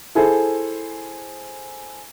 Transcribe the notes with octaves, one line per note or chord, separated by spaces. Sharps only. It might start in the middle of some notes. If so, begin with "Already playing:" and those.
E4 G#4 A4 C5